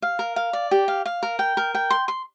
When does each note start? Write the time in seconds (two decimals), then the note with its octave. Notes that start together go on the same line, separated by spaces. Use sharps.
0.02 F5
0.19 A#4
0.36 F5
0.53 D5
0.71 G4
0.88 F5
1.06 F5
1.23 A#4
1.39 G5
1.57 A#4
1.74 G5
1.90 C6
2.08 C6